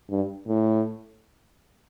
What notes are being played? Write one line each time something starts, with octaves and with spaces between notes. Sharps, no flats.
G2
A2